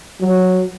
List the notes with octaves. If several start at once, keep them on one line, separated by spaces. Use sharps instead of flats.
F#3